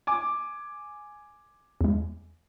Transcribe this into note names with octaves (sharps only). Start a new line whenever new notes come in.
G#5 D6
E2 G#3